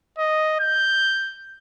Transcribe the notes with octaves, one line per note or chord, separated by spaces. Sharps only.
D#5
G6